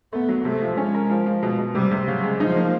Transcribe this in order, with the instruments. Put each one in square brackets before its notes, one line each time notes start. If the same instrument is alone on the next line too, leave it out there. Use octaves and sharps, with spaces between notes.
[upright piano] A3 [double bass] B3
[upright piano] F#3
[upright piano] C3 [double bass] A3
[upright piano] F3
[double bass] G#3 [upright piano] C#4
[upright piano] A#4
F3
F3
B2
B2
[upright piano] C3 [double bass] G3
[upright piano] C3
[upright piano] C#3 [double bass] F#3
[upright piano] G#3
[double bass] F3 [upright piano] D#4
[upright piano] A#3